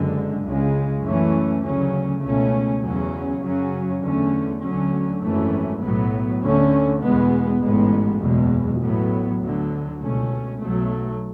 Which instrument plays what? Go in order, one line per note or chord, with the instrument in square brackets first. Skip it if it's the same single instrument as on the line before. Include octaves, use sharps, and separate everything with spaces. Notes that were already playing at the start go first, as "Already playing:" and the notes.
Already playing: [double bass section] F#1 F#2 D3 G#3
C#2 C#3 G#3
F#2 E3 A3 C#4
D2 C#3 F#3 C#4
C#2 B2 A3 C#4
E2 C#3 F#3 C#4
F#2 C#3 F#3 C#4
E2 D3 A3 C#4
D2 D3 F#3 C#4
G#1 F#2 E3 A3 C#4
B1 A2 F#3 B3
D2 D3 A3 C#4
E2 B2 G#3 B3
A1 G#2 G#3 B3
F#1 E2 B2 G#3
A1 A2 F#3 B3
D2 D3 F#3
C#2 B2 A3 C#4
B1 B2 F#3 A3